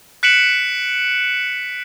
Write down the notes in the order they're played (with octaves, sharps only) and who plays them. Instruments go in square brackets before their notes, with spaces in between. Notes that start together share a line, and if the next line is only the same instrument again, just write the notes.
[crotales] F#6 B6 C#7 D7 E7 F#7